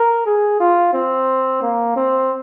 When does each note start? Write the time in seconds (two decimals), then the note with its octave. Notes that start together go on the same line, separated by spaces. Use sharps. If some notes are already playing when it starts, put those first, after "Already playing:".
Already playing: A#4
0.26 G#4
0.60 F4
0.93 C4
1.62 A#3
1.96 C4